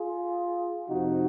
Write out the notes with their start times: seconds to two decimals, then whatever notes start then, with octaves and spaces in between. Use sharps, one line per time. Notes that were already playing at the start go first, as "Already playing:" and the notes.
Already playing: F4 G#4
0.88 F2 C3 F3 D#4 F#4